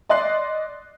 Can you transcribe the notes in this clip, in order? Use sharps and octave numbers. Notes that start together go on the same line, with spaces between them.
D5 D#5 C6 F#6 C7